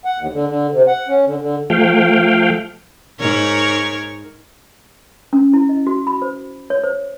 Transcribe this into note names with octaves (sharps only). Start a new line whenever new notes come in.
F#5
D#2
D3
D3
C3
F#5
C#4
D3
D3
F3 A3 F5 G5
G#2 A#4 C#5
C#4
E4
D#5
F#4
B5
C5
C#5
C5